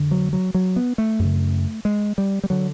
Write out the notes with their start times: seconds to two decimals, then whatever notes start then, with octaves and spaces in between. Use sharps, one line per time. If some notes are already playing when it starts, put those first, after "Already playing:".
Already playing: F2 D3
0.11 F#3
0.33 F#3
0.55 F#3
0.76 B3
0.98 A3
1.19 F#2 C#3
1.85 G#3
2.18 G3
2.44 G3
2.50 D3 F#3